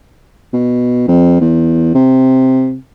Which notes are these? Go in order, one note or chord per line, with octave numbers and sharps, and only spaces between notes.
B2
F2
E2
C3